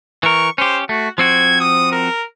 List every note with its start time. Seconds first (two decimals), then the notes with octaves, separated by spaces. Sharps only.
0.23 E3 A#4 C#6
0.58 C#4 G4 C5
0.89 A3 F#4
1.18 F3 C4 F#4 G#6
1.61 D#6
1.92 A#4